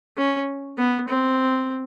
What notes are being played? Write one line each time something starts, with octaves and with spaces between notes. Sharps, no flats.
C#4
B3
C4